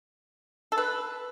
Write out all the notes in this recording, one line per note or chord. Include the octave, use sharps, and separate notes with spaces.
A4
B4